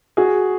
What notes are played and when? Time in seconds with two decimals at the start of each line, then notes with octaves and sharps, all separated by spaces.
0.17 F#4 G#4